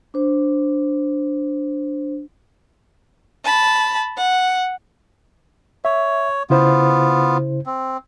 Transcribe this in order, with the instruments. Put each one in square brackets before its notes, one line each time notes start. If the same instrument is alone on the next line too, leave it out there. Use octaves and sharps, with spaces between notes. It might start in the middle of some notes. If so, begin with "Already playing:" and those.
[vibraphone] D4 C5
[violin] A5 B5
F#5
[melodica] C#5 [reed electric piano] E5
[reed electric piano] C#3 E4 C5 [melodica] B3 F4
[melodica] C4